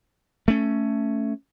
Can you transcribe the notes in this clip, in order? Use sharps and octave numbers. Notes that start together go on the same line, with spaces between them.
A3 C#4